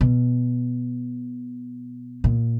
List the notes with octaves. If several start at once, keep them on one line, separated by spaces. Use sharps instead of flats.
B2
A#2